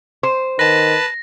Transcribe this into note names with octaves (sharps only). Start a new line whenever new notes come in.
C5
D#3 B4 A5 A#6